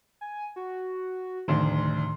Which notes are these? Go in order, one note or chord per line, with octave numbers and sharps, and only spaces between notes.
G#5
F#4
F1 D2 A2 D#3 D5 C6